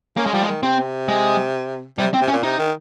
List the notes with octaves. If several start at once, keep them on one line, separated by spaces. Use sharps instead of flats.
A#3 C#4
G#3
F3 G3
G#3
D#3
C3 C4
G#3
C3 G3
C4
C3
C#4
A#2
C3 D#4
D#3